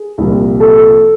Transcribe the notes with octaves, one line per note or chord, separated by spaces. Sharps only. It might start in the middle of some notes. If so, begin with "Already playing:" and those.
Already playing: G#4
C2 A#2 F3
A4